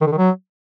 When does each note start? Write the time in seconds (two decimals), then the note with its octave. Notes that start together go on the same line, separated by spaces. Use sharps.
0.01 D#3
0.07 D3
0.12 D#3
0.18 F#3